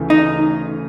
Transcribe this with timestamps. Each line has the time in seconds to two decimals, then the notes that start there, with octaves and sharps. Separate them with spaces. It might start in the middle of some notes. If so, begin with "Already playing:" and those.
Already playing: D2 C#3 E3 A3
0.10 D#4